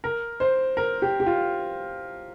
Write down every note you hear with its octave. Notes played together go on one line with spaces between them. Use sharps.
A#4
C5
A#4
G4
G4
F4